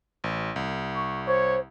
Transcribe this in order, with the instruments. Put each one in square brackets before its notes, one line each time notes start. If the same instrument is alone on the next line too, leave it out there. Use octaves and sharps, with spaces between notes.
[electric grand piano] A1
C2
[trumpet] C#6
[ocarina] C5 [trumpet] C#5